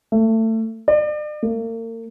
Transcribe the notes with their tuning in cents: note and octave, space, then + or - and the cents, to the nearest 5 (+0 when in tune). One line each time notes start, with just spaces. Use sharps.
A3 +25
D5 +40
A#3 -40